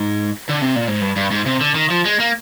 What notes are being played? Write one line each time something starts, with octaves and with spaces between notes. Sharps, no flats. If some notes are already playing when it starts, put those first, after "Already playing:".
Already playing: G#2
D3
C3
A#2
G#2
G2
G2
G#2
C3
D3
D#3
F3
G#3
A#3